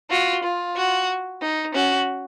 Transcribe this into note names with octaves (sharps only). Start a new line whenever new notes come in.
F4 F#4
F4
F#4
D#4
C#4 F#4